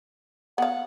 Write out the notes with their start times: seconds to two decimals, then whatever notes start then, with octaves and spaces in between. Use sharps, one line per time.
0.58 B3 F5 F#5